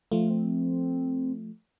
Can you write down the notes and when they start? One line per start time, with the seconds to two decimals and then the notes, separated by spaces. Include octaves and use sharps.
0.12 F3 A3 F4
0.30 C4